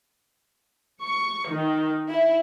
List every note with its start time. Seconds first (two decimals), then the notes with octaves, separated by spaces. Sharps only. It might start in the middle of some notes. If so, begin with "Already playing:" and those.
1.02 C#6
1.50 D#3
2.08 E4